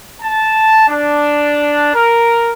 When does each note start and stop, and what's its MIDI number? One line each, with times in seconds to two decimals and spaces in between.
0.22 0.88 81
0.89 1.92 62
1.95 2.52 70